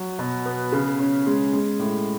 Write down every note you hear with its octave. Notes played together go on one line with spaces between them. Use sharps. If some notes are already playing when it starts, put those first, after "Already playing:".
Already playing: F#3
B2
B3
C#3
C#4
G#3
G#3
A2